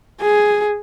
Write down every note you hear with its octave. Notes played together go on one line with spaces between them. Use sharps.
G#4